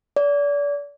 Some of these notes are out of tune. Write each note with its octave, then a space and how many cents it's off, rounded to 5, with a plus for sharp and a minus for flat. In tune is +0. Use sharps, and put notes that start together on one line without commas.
D5 -35